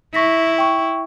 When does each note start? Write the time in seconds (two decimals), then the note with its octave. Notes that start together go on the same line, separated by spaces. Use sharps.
0.14 E4 C#6 A#6 B6
0.58 G5 C#6